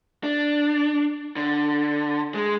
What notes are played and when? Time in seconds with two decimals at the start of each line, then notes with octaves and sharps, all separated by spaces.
0.24 D4
1.36 D3
2.34 G#3